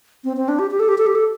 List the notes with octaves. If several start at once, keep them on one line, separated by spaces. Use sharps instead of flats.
C4
C4
D4
G4
G4
A4
G4
A4
G4
A4